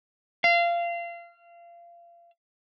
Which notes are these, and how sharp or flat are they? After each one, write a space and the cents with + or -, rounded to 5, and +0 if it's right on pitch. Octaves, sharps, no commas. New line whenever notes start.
F5 -25